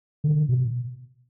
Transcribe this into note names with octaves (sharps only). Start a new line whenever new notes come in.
D3
B2